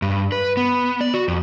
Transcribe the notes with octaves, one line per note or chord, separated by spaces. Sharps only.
G2
B4
B3
D5
F#4
F2